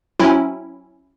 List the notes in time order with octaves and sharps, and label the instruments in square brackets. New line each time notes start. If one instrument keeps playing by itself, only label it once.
[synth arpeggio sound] F#3 C4 C#4 E4